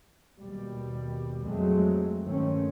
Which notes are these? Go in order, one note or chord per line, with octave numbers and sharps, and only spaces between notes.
D#2 B2 G3
F2 F#3 G#3 A3 C4
G2 D#3 A3 C4 C#4